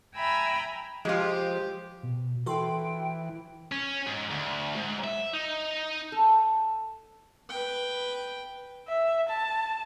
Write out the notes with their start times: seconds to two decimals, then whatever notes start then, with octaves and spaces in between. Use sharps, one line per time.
0.16 E5 G5 G#5 A#5 B5 E6
1.05 F3 G#3 F4 G4
2.03 B2
2.46 E3 F#4 A4 G5 C6
3.72 C#4
4.07 G#2
4.31 D2
4.76 G#2
5.04 E5
5.33 D#4
6.12 A4
7.49 B4 G5
8.88 E5
9.29 A5